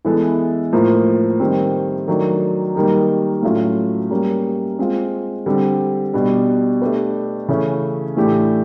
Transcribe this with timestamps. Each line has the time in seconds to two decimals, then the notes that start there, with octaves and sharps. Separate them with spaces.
0.05 E3 G#3 B3 E4 A4
0.73 A2 F3 A#3
1.40 D#3 G3 C4
2.08 D#3 F#3 A3 D4
2.75 D#3 G3 A#3 D#4
3.42 A2 F#3 A3 C#4 F4
4.11 G3 A#3 C#4
4.79 G#3 C4 F4
5.46 D3 G3 C4
6.14 B2 G3 B3 D4
6.82 A3 D4 G4 B4
7.48 C#3 E3 A3 C#4
8.17 A2 E3 A3 D4 G4